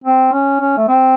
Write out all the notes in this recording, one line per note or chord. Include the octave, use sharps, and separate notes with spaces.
C4
C#4
C#4
A3
C4